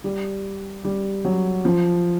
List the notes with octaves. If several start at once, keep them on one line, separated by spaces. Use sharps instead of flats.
G3
G3
F#3
F3